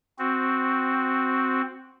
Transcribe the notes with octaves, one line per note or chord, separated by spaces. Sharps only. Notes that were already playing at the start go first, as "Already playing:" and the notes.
C4 F#4